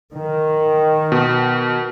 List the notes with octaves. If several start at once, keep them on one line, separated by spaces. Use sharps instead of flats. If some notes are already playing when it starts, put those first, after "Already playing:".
D#3
B2